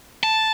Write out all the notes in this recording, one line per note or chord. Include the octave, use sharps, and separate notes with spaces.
A5